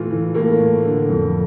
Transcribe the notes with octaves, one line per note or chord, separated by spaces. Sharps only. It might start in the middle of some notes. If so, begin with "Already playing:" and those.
Already playing: A2 E3 F4
E3
A2 A#3
A2
D3
F2